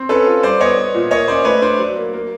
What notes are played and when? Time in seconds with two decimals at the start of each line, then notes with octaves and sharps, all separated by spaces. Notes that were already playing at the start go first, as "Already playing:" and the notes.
Already playing: C4
0.09 C#4 A4 B4
0.26 F4
0.43 G3 C5 D5
0.60 B3 C#5 D#5
0.77 B3
0.94 A#2
1.11 A#3 C#5 D#5
1.28 C#4 C5 D5
1.45 A3 B4 C#5
1.62 D4 C5 D5
1.79 F#3
1.96 A#3
2.13 A#3